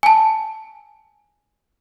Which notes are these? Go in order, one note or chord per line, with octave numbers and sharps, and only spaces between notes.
G#5 A5